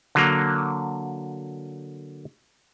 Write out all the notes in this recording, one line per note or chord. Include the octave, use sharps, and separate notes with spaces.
D3 F#3 A#3